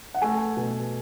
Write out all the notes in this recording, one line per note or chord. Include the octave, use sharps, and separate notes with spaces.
F#5
A3 G#5
B2